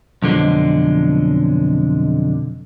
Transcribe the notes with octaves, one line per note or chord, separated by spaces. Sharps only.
B1 F2 D3 G#3